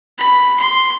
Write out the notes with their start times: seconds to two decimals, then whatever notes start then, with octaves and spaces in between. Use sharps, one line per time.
0.19 B5
0.60 C6